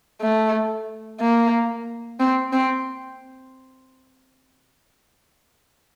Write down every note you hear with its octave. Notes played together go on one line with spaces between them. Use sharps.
A3
A#3
C4
C4